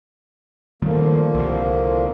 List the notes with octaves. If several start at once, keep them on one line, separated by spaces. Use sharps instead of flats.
D3 D#3 F3 G3 A3 A#3
C2 C3